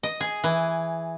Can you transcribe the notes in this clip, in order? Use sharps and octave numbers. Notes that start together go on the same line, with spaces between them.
D#5
G#4
E3